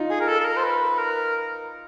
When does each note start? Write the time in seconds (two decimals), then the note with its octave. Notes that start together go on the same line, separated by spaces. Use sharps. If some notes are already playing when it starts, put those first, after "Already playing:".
Already playing: D#4 F4
0.10 G#4
0.21 A#4
0.28 A4
0.41 A4
0.45 A#4
0.57 C5
0.64 B4
0.98 A#4